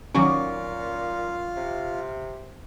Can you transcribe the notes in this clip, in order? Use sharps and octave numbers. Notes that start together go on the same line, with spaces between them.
A#2 D#3 F#3 C#4 F4 C#6 D6
C3